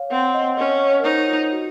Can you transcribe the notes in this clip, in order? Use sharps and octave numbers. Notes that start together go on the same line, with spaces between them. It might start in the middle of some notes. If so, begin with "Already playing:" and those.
Already playing: C#5 F5
C4 F#5
D#5
C#4 D#5
C#5
A#4
D#4 C5
F4
F#4